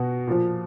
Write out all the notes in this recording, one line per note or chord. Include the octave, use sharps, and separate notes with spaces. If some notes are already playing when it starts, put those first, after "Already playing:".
Already playing: B2 F#4
A#2 F3